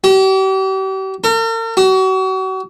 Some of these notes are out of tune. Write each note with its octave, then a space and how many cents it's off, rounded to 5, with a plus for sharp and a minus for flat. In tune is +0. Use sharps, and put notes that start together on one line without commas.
G4 -40
A#4 -45
F#4 +35